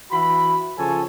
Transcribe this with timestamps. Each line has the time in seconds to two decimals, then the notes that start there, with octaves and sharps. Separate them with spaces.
0.11 E3 F#4 E5 B5
0.77 C#3 F3 A4 C#5 G#5